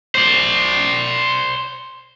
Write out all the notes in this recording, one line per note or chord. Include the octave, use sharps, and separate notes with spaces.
C5 D5